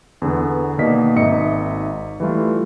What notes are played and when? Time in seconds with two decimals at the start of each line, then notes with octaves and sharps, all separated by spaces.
0.22 E2 D3 B3
0.78 B2 D#3 A#3 D5 D#5 B6
1.16 G#1 D#4 D#5 E5 C#7
2.20 E3 G3 A3 F4